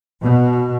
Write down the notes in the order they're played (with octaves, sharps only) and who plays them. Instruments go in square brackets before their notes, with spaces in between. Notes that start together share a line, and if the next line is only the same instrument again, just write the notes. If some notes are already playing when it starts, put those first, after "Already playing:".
[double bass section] B2